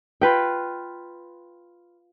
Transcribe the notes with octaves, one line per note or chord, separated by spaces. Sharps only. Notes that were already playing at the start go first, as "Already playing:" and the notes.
F4 B4 G5